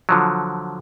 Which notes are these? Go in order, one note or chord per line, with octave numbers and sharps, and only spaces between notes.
D3 F3 F#3